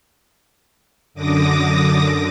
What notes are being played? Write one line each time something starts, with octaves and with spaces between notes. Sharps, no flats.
F#2 D3 D6 D#6 A#6